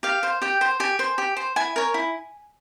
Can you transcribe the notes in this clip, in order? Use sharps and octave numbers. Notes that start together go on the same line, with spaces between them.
G4 F5
C5
G4 G5
C5
G4 G#5
C5
G4
C5
E4 G#5
A#4 C#5
E4